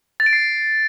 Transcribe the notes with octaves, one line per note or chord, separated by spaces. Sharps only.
A6
D7
C7